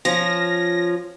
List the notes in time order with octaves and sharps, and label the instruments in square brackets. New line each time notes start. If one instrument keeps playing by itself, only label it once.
[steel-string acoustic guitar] F3 C#4 [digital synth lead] A#6